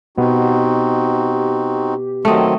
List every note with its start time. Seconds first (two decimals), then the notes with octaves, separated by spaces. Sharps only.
0.18 B2 B3 C4 D#4 F#4 G4
2.25 D#3 F#3 A3 C4 D#5